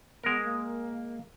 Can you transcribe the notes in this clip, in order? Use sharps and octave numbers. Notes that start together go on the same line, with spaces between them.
G#3 B3 A#4
A#3